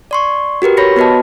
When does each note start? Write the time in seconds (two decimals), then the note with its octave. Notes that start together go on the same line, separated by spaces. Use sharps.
0.11 D5 C6 C#6
0.62 F#4 G4 A#4 B4
0.77 C#5 B5 A#6 C#7
0.96 B3 F#4 B4 D#5 A5